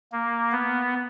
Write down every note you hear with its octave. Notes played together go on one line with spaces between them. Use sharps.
A#3
B3